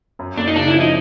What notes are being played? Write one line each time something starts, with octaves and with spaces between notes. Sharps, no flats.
F#2
A#3 D4
D#4
C#3 D4
E4
F3
D#4